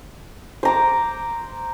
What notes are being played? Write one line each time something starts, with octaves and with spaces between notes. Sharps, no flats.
C5 A#5 D6